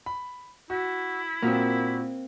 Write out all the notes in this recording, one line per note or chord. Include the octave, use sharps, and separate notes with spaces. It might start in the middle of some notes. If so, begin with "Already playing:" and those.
B5
E4 F#4
A#2 A#3 C4 F#4